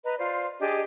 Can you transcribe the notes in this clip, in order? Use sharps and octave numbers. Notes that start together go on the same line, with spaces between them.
B4 D#5 A#5
F4 C5 D5
D4 G4 G#4 D#5